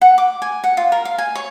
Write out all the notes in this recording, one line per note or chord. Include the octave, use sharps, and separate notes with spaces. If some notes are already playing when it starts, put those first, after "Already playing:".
F#5
D6
G#5
F#5
F4
A#4
F5
G#5
C#5